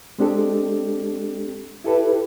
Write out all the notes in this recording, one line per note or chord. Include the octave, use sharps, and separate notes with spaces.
G#3 C4 D4 G4 A4
E4 G4 A4 B4